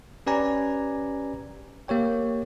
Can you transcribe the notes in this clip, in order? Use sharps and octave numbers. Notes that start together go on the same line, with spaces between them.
C#4 G4 B4 D5 G#5 A#5
A#3 G4 C#5 G5